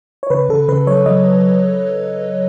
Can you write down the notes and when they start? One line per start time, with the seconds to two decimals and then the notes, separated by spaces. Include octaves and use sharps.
0.23 C#5
0.30 C#3 B4
0.49 C#3 A4
0.68 C#3 B4
0.87 F#3 C#5
1.06 F#3 D#5